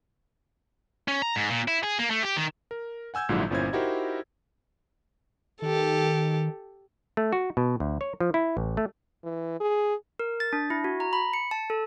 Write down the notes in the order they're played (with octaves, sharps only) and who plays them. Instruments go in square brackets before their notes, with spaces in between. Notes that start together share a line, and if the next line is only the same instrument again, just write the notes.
[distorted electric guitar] C#4
A#5
G#2
A#2
E4
G#4
A#3
A3
G4
D#3
[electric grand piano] A#4
F#5 G#5 E6 G6 G#6
A#1 G#2 D3 F#3 E4 F4
G1 A#2 C#4 E4 C5 G#6
D#4 E4 F#4 G4 A#4 C5
[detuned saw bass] D#3 [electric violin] G4 A4
[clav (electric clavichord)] A3
F#4
B2
D2
C#5
F3
E4
A1
A3
[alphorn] E3
G#4
[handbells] A#4
A6
D4
E4
F#4
A#5
B5
C#7
A5
A4